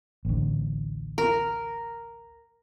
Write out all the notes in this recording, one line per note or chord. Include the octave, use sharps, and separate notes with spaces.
A1 D2
A#4